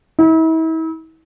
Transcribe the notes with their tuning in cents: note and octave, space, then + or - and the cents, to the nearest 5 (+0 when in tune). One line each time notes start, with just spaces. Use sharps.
E4 -40